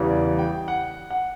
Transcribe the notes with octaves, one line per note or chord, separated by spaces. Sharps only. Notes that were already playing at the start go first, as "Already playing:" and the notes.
Already playing: E2 C#3 E3 G3
D5
G5
F#5
F#5